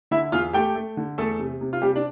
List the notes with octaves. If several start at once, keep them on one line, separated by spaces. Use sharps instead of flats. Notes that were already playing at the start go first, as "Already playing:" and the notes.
D3 E4 E5
E2 F4 F5
A3 G4 G5
A3
D3
E2 A3 A4
C3
C3
F4
C3 G3 G4
D4